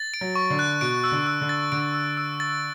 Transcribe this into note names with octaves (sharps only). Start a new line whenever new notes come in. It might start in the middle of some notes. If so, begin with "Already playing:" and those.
Already playing: A6
D7
F#3
C#6
D3
F#6
B2 D7
E6
D3
E6
D3
A6
D3 D7
E6
E6
A6